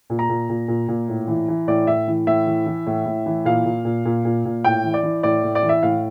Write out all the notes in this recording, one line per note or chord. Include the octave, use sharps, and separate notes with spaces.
A#2
A#5
A#2
A#2
A#2
A#2
A2
E3
E3
A2 D5
A2 E5
E3
A2 E5
E3
E3
A2
A2
E3
A#2 F5
A#2
A#2
A#2
A#2
A#2
A2 G5
E3
D5
E3
A2 D5
A2
D5
E3
E5
A2 F5